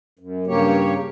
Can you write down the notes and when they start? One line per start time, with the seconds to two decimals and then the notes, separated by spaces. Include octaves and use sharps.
0.19 F#2
0.47 G2 C#3 A#3 G4 C#5